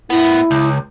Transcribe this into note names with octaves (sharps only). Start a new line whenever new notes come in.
A2 B3 E4
C#2